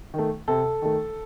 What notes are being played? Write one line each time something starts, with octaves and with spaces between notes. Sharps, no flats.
D#3 A3
C3 A4
D#3 A3